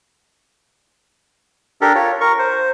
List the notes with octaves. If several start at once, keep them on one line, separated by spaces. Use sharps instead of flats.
D4 G4 A4 A#4
F4 C#5
A#4 C#6
C5